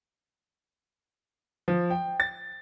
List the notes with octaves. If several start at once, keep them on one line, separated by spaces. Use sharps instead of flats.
F3
G5
A6